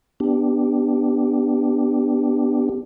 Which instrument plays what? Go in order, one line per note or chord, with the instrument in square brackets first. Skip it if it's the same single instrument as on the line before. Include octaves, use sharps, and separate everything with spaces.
[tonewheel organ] B3 D4 G4